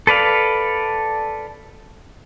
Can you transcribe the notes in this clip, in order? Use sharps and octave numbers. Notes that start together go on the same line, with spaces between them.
A4 B4 D5 F5